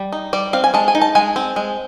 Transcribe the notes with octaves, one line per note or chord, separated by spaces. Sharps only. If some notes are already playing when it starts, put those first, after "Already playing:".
Already playing: G3
D#4
G3 D5
C4 F5
G#5
G#3 A5
G#5
D#4
A5
G#3 G#5
C4
G#3